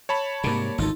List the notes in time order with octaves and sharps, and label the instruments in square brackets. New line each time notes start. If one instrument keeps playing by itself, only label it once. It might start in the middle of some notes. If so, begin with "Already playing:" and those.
[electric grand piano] C#5 A5 B5
[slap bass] G#2 C3 [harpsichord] G3 A#3
[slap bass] G#1 D2 [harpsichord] D#4 F4 A4